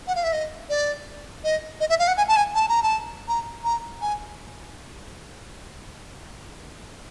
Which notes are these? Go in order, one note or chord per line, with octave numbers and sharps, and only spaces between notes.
F#5
F5
E5
D#5
D5
D#5
D#5
E5
F5
F#5
G#5
A5
G#5
A5
A#5
A5
A#5
A#5
G#5